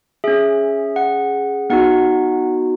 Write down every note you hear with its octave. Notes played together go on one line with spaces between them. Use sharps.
C#4 G#4 E5
F#5
B3 D#4 F#4 F#5